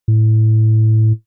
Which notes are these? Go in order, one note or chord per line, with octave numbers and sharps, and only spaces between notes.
A2